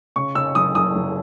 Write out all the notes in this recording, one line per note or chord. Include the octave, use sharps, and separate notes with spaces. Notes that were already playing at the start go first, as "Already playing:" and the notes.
C#3 C#6
C#3 E6
F#1 D#6
F#1 D#6
F#1